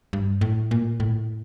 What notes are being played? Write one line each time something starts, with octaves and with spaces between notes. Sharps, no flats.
G2
A2
A#2
A2